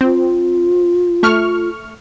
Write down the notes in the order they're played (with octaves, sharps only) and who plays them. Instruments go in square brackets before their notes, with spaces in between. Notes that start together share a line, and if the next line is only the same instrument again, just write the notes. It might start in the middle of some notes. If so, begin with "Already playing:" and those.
[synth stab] C4 [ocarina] F4
[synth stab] A3 C#6 F6